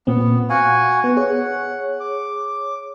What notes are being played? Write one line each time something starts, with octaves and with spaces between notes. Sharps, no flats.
A#2 B3 C4
F#4 F5 F#5 G#5
B3
G#4 C#5 F#5
D6